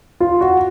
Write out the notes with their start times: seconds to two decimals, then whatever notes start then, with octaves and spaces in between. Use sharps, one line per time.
0.20 F4
0.41 F#4